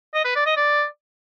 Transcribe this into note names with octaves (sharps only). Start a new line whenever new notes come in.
D#5
B4
D5
D#5
D5